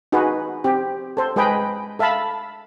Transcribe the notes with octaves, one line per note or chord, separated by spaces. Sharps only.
D#4 F#4 G#4 B4
C4 G4
A4 C5
G#3 G#4 B4 D#5 G5 B5
A4 E5 F5 A5 B5